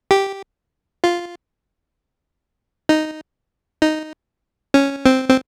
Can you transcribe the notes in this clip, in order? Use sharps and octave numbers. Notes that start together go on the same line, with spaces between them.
G4
F4
D#4
D#4
C#4
C4
C4